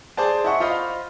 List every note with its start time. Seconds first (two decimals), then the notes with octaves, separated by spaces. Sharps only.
0.17 G#4 C5 D5 A5
0.44 E4 D#5 F#5 C#6
0.60 F4 C5 D#5 F5 B5